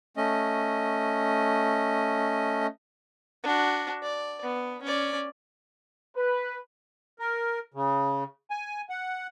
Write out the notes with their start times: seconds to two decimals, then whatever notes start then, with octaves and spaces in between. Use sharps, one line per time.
0.17 A3 C#4 D#5
3.44 D4 F#4
4.03 D5
4.43 B3
4.83 C#4 D5
6.16 B4
7.19 A#4
7.74 C#3
8.51 G#5
8.90 F#5